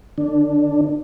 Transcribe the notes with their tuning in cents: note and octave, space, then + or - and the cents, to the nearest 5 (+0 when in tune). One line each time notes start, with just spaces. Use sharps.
D3 +30 D4 +0